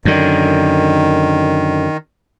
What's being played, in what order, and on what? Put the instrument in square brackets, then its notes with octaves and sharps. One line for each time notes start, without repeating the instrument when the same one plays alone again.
[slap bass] F#2 D3 [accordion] D#3